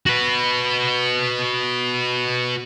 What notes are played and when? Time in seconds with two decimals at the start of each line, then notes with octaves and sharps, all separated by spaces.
0.06 F#4 B4